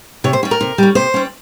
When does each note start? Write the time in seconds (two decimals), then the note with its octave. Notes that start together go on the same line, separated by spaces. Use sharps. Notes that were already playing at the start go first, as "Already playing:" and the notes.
0.24 C3 C#5
0.33 C5
0.43 G3 C#4
0.51 A#4
0.61 C3
0.78 G3 C#4
0.95 C3 C5
1.14 G3 C#4